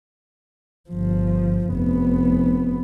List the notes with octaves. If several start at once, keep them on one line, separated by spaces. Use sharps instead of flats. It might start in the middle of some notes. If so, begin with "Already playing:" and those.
G1 F3
F1 B3